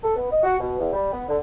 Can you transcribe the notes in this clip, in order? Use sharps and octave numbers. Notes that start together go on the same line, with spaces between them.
A4
B3
D#5
F#4
B2
E2
G3
B3
D3